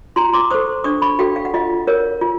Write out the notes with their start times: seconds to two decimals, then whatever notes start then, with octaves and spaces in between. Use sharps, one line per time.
0.16 F4 A#5 C6
0.33 C6 D6
0.50 A4 C5 C#6 D#6
0.84 D4 C#6 D#6
1.02 B5 C#6
1.19 F#4 A4 F5 G5
1.36 F5
1.45 F#5
1.54 F4 D#5 F5
1.87 A#4 C#5
2.21 F4